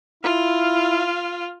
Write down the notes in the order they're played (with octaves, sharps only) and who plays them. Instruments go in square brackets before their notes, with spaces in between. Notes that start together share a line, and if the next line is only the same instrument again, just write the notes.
[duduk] E4 [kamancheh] F4 F5